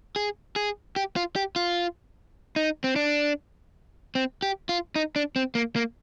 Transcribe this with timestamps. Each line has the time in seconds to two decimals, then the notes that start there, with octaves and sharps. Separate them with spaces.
0.16 G#4
0.56 G#4
0.96 G4
1.16 F4
1.36 G4
1.56 F4
2.56 D#4
2.84 C4
2.96 D4
4.15 C4
4.42 G4
4.69 F4
4.96 D#4
5.16 D4
5.36 C4
5.55 A#3
5.76 A#3